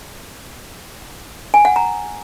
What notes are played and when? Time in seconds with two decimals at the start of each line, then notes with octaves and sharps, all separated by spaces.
1.54 G#5
1.65 F#5
1.76 A#5